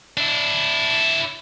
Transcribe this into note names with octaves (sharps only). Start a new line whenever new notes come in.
D4 E4